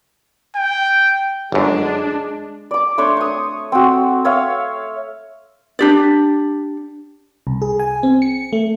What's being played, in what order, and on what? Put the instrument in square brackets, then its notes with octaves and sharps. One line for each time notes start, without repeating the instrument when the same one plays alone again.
[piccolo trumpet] G5
[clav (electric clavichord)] G1 F#2 [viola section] G#3 D4
[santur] D5 D6
A3 D4 C5 C#5
C#6 D#6
C4 F#4
C#5 E5 F5
[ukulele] D4 G4 D5
[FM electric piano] C2
G#4
G#5
C4
C#7
A3